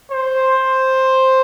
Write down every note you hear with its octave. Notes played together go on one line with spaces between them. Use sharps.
C5